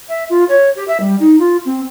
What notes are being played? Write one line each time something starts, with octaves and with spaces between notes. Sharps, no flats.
E5
F4
C#5
G4
E5
G3
D#4
F4
C4